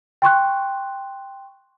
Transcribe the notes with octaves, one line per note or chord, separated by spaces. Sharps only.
G5 C6 C#6 F#6